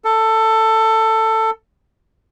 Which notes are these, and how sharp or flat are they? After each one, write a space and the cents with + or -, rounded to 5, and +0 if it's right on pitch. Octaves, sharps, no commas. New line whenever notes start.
A4 +15